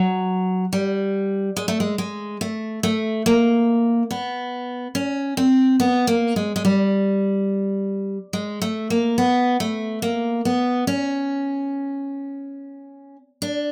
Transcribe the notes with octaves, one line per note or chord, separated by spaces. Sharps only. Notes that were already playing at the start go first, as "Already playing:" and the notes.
Already playing: F#3
G3
G#3
A3
G#3
G#3
A3
A3
A#3
B3
C#4
C4
B3
A#3
G#3
G#3
G3
G#3
A3
A#3
B3
A3
A#3
B3
C#4
D4